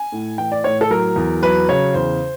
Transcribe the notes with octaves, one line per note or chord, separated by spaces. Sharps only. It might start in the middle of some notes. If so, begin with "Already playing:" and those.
Already playing: G#5
A2
E3 G5
D5
A2 C#5
A4
F#3 A#4
E2
F#3 B4
C#3 C#5
E2 C5